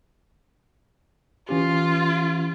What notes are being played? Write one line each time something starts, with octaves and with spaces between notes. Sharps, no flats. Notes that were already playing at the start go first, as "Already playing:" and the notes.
E3 C#4 F4 G4